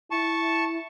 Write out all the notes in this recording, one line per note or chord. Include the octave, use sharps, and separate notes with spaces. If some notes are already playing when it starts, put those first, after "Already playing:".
E4 A5 C#6